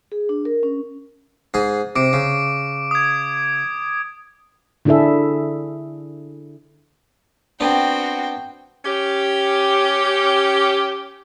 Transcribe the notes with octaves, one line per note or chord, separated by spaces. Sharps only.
G#4
D4
A#4
C#4
G#2 G#4
C3 D6 D7
C#3
D#6 G#6
D3 D4 E4 G#4 A4 E5
B3 C4 D4 F#4 G5
C#4 G4